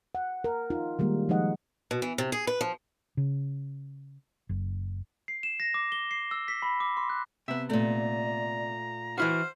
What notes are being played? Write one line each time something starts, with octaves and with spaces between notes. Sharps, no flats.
F#5
A#4
D#4 F4
D#3 G3 G#3 A#3
F3 G#3 D#4 D#5 F#5
B2
E3
C3
G#4
B4
F3
C#3
F#1
C7
E7
A#6
D6
G7
C7
E6
B6
B5
D6
C6
F#6
C3 B3 E5
A#2 A3 D5 A#5
E3 E4 F#4 C5 F6